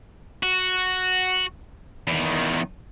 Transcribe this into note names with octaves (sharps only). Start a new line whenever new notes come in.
F#4
E2 D#3